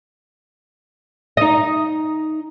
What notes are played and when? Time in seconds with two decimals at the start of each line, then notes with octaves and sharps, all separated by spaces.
1.37 D#4 D#5